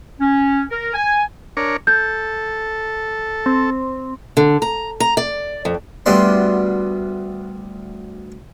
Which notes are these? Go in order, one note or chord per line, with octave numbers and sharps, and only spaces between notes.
C#4
A#4
G#5
D4 A#4 C#5
A4 G6
C4
D3
A#5
A#5
D5
F2
D2 G3 B3 D5 C6